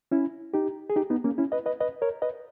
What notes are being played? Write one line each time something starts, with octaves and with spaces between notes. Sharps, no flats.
C#4 E4
D#4 G4
G#4
D#4 G4
B3 D#4
A#3 C#4
C#4 E4
B4 D#5
B4 D#5
B4 D#5
A#4 C#5
B4 D#5